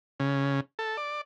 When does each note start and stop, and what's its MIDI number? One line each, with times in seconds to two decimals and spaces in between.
0.20 0.60 49
0.79 0.97 69
0.97 1.21 74